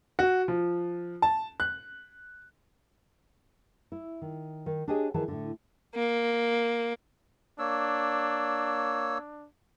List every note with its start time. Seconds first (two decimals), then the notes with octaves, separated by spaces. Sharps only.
0.19 F#4
0.48 F3
1.22 A5
1.60 F#6
3.92 E4
4.22 D#3
4.66 D#3
4.88 D4 G4 G#4 C#5 D#5
5.14 D#3 E3 G#4 A5
5.28 A2 D3
5.95 A#3
7.59 A#3 D4 C#5 E6